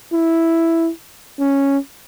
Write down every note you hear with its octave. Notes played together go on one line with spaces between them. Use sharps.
E4
C#4